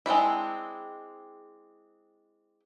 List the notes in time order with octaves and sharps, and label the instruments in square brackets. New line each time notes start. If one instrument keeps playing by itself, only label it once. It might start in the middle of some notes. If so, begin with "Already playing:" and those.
[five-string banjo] G#3 C4 D4 E4